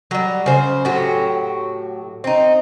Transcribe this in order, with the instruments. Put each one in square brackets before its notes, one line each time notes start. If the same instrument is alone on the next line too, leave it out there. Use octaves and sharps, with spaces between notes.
[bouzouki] F#3 G3
C#3 C5
A2 F#3 F#4 G4
C4 D#4